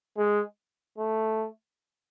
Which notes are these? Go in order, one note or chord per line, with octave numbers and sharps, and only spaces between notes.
G#3
A3